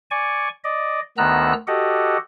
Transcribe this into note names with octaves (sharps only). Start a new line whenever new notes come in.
D5 G#5 C#6
D5 D#5
D2 D#3 B3 A#5 E6 F#6
F#4 G4 A4 D#5 F#5